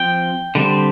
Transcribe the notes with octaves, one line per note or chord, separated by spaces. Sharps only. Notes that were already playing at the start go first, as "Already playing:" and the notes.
Already playing: F3 C4 G5
D3 G3 C4